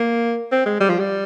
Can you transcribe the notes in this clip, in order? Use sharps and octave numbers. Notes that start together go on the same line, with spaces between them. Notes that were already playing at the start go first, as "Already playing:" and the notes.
Already playing: A#3
C4
G#3
G3
F3
G3